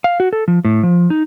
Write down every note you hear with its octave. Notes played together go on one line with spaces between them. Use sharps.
F5
F#4
A4
F3
A2
F3
D#4